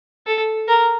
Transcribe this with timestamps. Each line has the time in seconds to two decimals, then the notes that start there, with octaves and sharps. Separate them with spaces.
0.27 A4
0.68 A#4